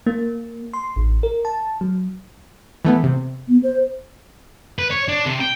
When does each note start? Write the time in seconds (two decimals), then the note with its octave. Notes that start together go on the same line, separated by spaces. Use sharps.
0.07 A#3
0.73 C6
0.96 A1
1.23 A#4
1.45 A5
1.81 F#3
2.85 E3 A3 B3
3.04 C3
3.48 B3
3.63 C5
4.79 B4
4.91 C#5
5.08 D4
5.25 C3
5.40 G5